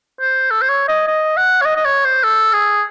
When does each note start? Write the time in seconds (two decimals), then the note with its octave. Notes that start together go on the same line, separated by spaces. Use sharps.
0.21 C5
0.50 A4
0.62 C5
0.69 C#5
0.88 D#5
1.07 D#5
1.37 F#5
1.61 C#5
1.65 D#5
1.76 D#5
1.85 C#5
2.05 C5
2.23 A4
2.53 G#4